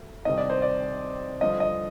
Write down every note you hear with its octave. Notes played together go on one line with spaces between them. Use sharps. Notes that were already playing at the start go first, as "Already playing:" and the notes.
Already playing: D2
C2 C3 D#3 D#5
D5
C5
D5
G2 D3 F3 D#5
D#5